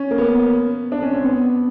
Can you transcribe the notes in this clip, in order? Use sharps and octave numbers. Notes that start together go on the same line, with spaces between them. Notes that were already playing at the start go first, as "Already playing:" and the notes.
Already playing: C#4
A#3
B3
D4
C#4
C4
B3